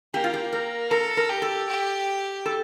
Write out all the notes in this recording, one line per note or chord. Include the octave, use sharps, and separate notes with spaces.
A#3 G4
F4
G4
A#4
A4 A#4
A#4
G4
A4
G4
A4